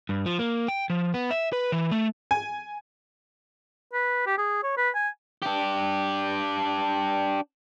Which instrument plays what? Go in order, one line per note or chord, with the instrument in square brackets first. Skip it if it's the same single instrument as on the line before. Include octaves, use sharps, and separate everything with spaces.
[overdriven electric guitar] G2
F3
A#3
G5
F3
B3
E5
B4
E3
A3
[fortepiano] G#5
[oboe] B4
G4
G#4
C#5
B4
G#5
[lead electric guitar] D4 G4